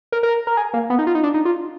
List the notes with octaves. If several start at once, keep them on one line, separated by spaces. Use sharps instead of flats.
A#4
A#4
A#4
G#4
A#3
B3
D#4
F4
D#4
D4
D#4
F4